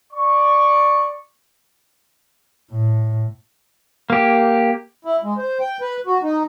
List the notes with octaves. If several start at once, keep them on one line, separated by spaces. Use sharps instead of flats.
D5 C#6
A2
A#3 G4
E4
G#3
C5
G5
B4
F#4
D#4